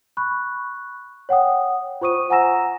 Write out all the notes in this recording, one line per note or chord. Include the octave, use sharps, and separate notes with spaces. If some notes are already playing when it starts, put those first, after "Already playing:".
B5 C#6 F#6
C#5 F#5 G5 D#6
F4 C5 C#6 D#6 D#7
F#5 G#5 A#5 E6 A#6 E7